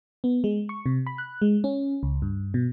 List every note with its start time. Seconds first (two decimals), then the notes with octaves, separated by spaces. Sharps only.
0.24 B3
0.44 G#3
0.69 C#6
0.86 C3
1.07 B5
1.18 F#6
1.42 G#3
1.64 C#4
2.03 C#2
2.22 G2
2.54 B2